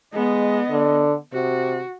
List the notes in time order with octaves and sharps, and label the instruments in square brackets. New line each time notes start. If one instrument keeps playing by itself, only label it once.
[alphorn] G#3 [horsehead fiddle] B3 D#5
[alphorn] D3
[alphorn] C3 [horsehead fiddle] F#4